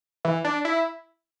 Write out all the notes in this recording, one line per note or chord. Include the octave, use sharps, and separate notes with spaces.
E3
D4
E4